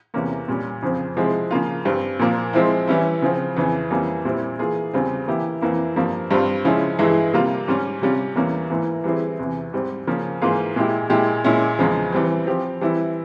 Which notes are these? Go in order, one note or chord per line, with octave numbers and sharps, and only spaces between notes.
E2 C3 E3 A#3 C#4
A#2 G3 C#4
F2 C#3 F3 C4
C3 F3 G#3 E4 G#4
C#3 F3 A#3 F4
G2 G3 C4
A#2 F3 A#3
F3 G#3 C4 E4
E3 G3 C#4 E4
C#3 F3 C4
F2 C#3 E3
F2 E3 G3 A#3 C#4
A#2 G3 C4 E4
E3 A#3 F4 G#4
E2 C#3 G3 C4 F4
E3 A#3 E4 G4
F2 E3 A#3 E4
G2 F3 A#3
G2 G3 C4 F4
C#3 F3 G#3 C#4 E4
G2 E3 G#3 E4 G#4
C3 G3 A#3 F4
G#2 G3 C#4
C3 G3 C#4 F4
E2 E3 G3 A#3 C#4
G#2 E3 A#3 E4
E3 G3 C4 E4 G#4
E2 C3 E3
G#2 G3 C4
C#3 F3 A#3 C#4
G#2 E3 A#3 F4 G#4
A#2 G#3 E4 G4
A#2 G#3 E4 G4
A#2 G#3 C#4 E4
E2 C#3 F3 G#3
E3 G3 C4
F3 C4 G4
E3 G3 C4 E4